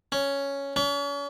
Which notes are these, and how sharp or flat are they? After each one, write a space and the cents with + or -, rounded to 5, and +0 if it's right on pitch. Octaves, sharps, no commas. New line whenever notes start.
C#4 +5
C#4 +40